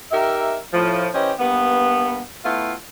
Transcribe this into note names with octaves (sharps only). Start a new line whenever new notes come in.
D#4 G4 A#4 E5
A2 F3
E3 C#4 G4 C5 D#5
G2 A#3 B3
A3 B3 E4 F4